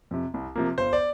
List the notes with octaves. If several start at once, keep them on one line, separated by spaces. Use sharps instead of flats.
F2 C3
C2
C3 F3 A#3
G1 C5
D5